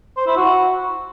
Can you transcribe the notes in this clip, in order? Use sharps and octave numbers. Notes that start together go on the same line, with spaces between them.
C5
E4
F#4